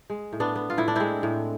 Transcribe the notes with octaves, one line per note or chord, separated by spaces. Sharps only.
G#3
A2
B3 D4
B3
F4
A2 E4
D4
G#3 C4 E4
A2